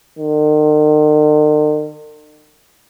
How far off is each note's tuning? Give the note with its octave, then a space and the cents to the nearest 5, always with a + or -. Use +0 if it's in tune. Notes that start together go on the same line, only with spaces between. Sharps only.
D#3 -45